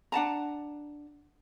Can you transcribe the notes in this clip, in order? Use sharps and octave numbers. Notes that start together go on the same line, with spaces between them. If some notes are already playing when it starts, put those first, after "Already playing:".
D4 F#5 A5 A#5